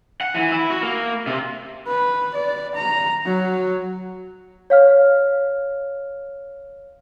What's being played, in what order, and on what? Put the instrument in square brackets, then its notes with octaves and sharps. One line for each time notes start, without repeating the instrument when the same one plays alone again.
[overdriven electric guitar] F#5
E3
E4
F#4
A#3
C3
[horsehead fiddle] B4
D5
A#5
F#3
[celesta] C#5 F5 F6